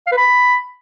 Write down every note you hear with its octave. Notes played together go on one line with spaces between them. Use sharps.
F5
B4
B5